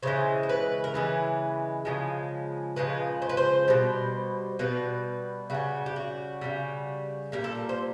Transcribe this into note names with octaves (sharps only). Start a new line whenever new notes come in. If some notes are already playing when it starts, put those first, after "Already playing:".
C#3 E3 G#3 C5
C5
B4
A#4
C#3 E3 G#3 B4
C#3 F3 G#3
C#3 F3 G#3 B4
C5
B4
C5
B2 G3 C5
B2 G3 B4
C#3 E3 G3 F#4
G4
F#4
C#3 E3 G3
A#2 G3 A#4
A4
A#4
C5